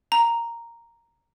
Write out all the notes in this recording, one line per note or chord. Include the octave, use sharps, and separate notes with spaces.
A#5